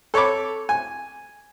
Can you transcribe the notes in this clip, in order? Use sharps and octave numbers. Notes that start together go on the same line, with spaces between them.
A4 C#5 B5 D6
G#5